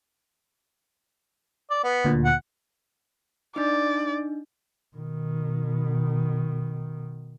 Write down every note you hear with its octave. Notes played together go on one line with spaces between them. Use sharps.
D5
B3
D2 A#2
F#5
D4 D#4 D5
B2 D#3